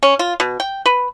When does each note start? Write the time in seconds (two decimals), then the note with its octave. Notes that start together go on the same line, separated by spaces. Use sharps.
0.03 C#4
0.19 F4
0.40 B2
0.60 G5
0.86 B4